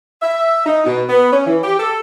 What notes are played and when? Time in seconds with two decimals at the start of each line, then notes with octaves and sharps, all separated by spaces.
0.22 E5
0.66 D#4
0.86 B2
1.09 B3
1.33 C#4
1.47 E3
1.64 G4
1.80 A4